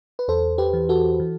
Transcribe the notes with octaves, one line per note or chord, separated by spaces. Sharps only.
B4
E2 A4 C5
G4 B4
E3
F#4 A4
E3